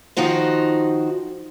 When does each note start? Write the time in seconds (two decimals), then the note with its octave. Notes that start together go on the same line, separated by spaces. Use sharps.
0.17 D#3 F3 D#4 F#4 C5